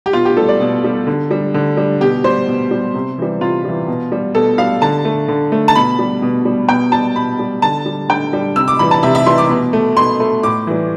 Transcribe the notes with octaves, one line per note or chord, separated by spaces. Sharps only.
G4
B2 F4
G4
G3 A4
D5
B2
G3
D3
G3
D3
G3
B2 G4
G3 C5
B2
G3
C3
E3 G3
C3 F4
E3 G3
B2
G3
B2 A4
G3 F5
D3 A5
A3
D3
A3
A5
B2 B5
G3
B2
G3
B2 G5
G3 A5
B2 B5
G3
D3 A5
G3
D3 G5
G3
C3 E6
D6
E3 G3 B5
A5
C3 E5
E5
E3 G3 C6
D6
B2
A3
B2 C6
A3
A2 D6
E3 G3